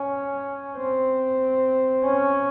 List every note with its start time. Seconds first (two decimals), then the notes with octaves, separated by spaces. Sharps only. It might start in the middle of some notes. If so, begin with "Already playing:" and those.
Already playing: C#4
0.78 C4
2.05 C#4